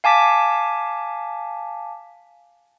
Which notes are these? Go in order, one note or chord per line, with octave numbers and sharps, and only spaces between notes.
F5 G#5 A5 D6 B6